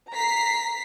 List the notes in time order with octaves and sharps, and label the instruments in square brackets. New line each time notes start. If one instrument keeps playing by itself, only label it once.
[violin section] A#5 B6 C7